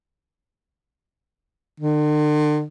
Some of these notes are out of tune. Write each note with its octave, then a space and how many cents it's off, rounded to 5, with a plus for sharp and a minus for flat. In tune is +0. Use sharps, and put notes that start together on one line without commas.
D3 +45